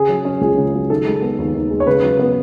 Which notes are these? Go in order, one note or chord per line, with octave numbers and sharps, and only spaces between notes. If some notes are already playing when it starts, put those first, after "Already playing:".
Already playing: C#3 G#4
F#3
C#4
C#2 G#4
C#3
F#3
D#3 A4
G#3
B3
D#2
D#3
G#3
C#5
C#3 B4
F#3
B3